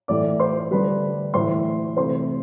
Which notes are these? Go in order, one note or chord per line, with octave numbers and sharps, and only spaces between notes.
A2 E3 A3 D5 D6
C5 C6
D3 G3 B4 B5
A2 E3 A3 C5 C6
C3 E3 A3 C5 C6